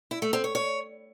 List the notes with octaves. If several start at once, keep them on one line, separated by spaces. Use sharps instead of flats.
E4
A3
C4
C#5
C#5